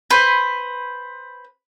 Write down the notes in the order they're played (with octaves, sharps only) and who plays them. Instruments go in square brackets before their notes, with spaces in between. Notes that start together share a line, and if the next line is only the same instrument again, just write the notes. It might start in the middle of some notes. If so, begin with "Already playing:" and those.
[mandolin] B4 C5